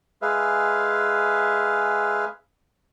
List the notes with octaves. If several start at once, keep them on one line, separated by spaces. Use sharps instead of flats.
G#3 G#4 B4 E5 F5